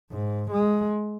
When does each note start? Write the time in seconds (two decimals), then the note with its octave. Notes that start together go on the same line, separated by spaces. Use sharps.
0.11 G#2
0.51 G#3